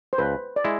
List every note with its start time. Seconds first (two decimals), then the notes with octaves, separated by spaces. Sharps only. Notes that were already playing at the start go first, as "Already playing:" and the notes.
0.13 C5
0.18 C#2 B4
0.56 D5
0.64 G#3 E4